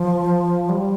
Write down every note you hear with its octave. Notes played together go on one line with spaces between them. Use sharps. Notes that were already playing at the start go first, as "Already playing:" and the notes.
Already playing: F3
G3